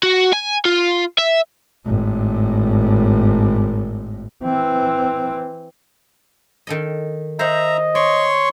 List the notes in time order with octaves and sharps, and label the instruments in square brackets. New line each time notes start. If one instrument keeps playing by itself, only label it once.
[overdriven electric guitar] F#4
G#5
F4
E5
[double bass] G#1 A2
E3 C4
[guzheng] D#3 A4 D#5
[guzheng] C5 F#5 [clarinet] D#5 [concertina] E5 A#5
[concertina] C#5 C6 C#6 [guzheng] D5